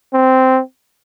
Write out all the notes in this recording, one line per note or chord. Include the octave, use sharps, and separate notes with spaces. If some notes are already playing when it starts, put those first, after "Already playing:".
C4